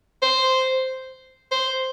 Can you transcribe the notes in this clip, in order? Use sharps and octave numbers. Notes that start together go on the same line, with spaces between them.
C5
C5